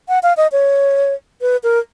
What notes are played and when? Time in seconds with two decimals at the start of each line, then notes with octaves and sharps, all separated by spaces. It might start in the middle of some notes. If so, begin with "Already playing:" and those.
0.09 F#5
0.23 F5
0.37 D#5
0.52 C#5
1.41 B4
1.63 A#4